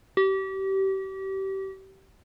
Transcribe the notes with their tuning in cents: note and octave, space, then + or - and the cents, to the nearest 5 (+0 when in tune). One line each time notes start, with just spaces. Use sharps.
G4 -30